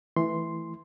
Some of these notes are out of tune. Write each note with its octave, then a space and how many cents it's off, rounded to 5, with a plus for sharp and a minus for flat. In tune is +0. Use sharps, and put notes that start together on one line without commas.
E3 +0 A3 +0 C6 +0